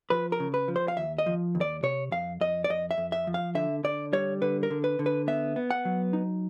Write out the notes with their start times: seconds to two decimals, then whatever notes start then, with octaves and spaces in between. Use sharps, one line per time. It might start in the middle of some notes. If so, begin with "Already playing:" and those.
0.10 F3 B4
0.32 A#4
0.40 C#3
0.54 B4
0.68 F3
0.76 C5
0.88 F5
0.97 D#2 E5
1.18 D#5
1.26 F3
1.55 D#2
1.61 D5
1.83 C3 C#5
2.12 F2 F5
2.41 F2 D#5
2.64 D5
2.70 F2 D#5
2.91 E5
2.98 F2
3.12 E5
3.27 F3
3.34 F5
3.55 D3 E5
3.84 D3 D5
4.13 G3 C#5
4.42 D3 B4
4.63 A#4
4.70 D3
4.84 B4
4.99 D3
5.06 B4
5.27 B3 E5
5.56 B3
5.71 F#5
5.85 F#3
6.13 D#4